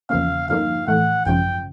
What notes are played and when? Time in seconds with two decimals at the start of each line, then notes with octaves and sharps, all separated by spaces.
0.10 E2 C#3 F3 A#3 C#4 F5
0.49 G2 D3 F3 A#3 D#4 F5
0.87 A2 E3 A3 F#5
1.26 G#1 F#2 C#3 F3 G5